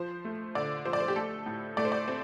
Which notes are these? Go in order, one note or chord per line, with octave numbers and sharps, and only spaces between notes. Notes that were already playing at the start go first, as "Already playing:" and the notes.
Already playing: F3 C5
A3
D3 D5
F3 C5
D5
C5
G4
A3 A4
A2
A3 D5
C5
D5
C4